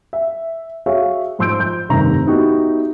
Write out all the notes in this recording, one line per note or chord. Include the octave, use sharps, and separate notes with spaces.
E5
F#4 G#4 C#5 E5 F5
G#2 F3 C6 E6 G6 D7
G6
F1 G2 C3 D#3 A#5
B3 D#4 E4 F#4 G4